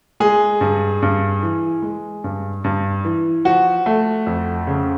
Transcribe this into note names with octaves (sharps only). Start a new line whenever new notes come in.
G#3 G#4
G2
G2
E3
G#3
G2
G2
E3
F3 F#4
A3
F2
C#3